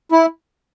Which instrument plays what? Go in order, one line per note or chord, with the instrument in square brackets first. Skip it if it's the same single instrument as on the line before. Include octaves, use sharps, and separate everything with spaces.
[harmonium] E4